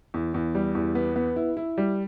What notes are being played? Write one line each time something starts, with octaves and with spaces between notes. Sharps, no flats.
E2
E2
G3
E2
B3
B3
E4
E4
G3